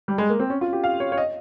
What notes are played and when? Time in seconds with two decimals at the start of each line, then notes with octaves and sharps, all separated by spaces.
0.08 G3
0.18 G#3
0.30 A#3
0.40 C4
0.50 C#4
0.61 F4
0.73 G4
0.84 F5
1.00 C#5
1.12 C#5
1.18 D#5